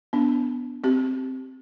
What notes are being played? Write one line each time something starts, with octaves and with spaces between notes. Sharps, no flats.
B3 D4
C4 G4